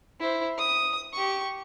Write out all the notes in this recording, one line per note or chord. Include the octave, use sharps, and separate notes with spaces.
E4 C5
D#6
G4 C#6